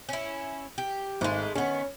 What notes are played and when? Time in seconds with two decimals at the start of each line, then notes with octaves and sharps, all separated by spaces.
0.09 C#4 E4
0.78 G4
1.21 G#1 G#3 A3
1.55 D#3 B3 C#4